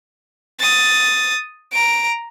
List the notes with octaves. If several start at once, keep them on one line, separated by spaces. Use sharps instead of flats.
D#6 A6
A#5 D7